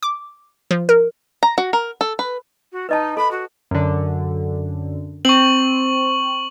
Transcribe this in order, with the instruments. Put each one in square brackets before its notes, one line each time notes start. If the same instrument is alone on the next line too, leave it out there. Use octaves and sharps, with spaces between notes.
[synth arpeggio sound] D6
F3
A#4
[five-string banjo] A#5
F#4
A#4
A4
B4
[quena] F#4
[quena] D#4 [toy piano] B4 D#5 A5
[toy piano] A4 [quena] B5
[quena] F#4
[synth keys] F#2 D3
[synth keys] C4 [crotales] C#6 F#7